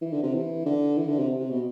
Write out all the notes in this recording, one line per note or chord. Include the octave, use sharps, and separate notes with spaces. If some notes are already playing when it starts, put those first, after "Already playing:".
E3
D3
C3
E3
D3
E3
D3
C3
C3
B2